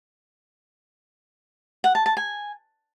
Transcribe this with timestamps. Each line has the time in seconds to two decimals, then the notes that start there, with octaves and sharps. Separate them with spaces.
1.84 F#5
1.95 A5
2.06 A5
2.17 G#5